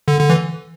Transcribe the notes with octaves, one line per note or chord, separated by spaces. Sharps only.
D3
D3
E3